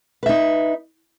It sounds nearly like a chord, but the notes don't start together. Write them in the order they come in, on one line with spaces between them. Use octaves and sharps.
B4 E5 D#4